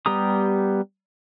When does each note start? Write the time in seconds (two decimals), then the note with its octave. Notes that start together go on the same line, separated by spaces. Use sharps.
0.06 G3 B3 G4 A#5 D#6